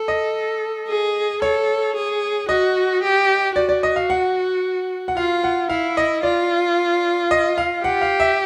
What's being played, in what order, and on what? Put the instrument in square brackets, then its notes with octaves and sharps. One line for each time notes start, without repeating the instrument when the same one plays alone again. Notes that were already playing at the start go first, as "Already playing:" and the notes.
Already playing: [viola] A4
[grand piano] D#5
[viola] G#4
[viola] A4 [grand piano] C#5
[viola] G#4
[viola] F#4 [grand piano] D#5
[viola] G4
[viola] F#4 [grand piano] D5
[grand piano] D5
D#5
F5
F#5
F#5
[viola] F4 [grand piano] F5
[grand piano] F#5
[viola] E4 [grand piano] F5
[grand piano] D#5
[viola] F4 [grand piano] D5
[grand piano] D#5
F5
[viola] G4 [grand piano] F#5
[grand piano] F5
E5